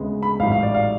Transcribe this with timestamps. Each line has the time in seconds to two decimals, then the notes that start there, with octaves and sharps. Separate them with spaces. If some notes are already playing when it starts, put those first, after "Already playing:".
Already playing: D2 C#3 G#3 B3
0.23 B5
0.39 A1 G#2 F#3 F5
0.52 F5
0.63 D5
0.74 F5